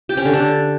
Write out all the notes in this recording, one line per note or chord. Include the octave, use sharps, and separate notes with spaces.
G4
C#4
D3
D4